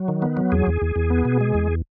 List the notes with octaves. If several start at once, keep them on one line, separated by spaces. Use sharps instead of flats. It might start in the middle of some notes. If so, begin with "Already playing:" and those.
Already playing: F#3
D#3
B3
F#3
E2 G#4
E2
E2
E2
B3
B2
G#3
E2